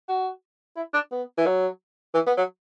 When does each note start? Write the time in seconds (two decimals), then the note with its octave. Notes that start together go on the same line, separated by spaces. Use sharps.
0.09 F#4
0.76 E4
0.94 D4
1.12 B3
1.38 E3
1.46 F#3
2.14 E3
2.27 B3
2.37 F#3